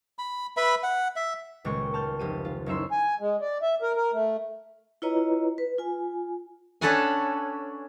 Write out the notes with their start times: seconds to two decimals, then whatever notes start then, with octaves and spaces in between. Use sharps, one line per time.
0.19 B5
0.57 B4 E5 B5
0.83 F#5
1.16 E5
1.65 D#1 C#2 A#2 G#3 G5 C#6
1.94 A5 F6 G6
2.19 F1 G4 D#7
2.45 F4
2.66 F#1 C#4 D#4 E5 C6
2.90 G#5
3.20 G#3
3.41 D5
3.62 E5
3.82 A#4
3.96 A#4
4.13 A3
5.02 E4 F4 B4 C#5 D#5 A#5
5.58 B4
5.78 F4 G#5
6.81 C#4 D4 A4 B4 F#5 G#5